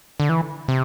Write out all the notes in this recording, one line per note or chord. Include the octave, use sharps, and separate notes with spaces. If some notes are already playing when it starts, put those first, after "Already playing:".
D3
E3
C3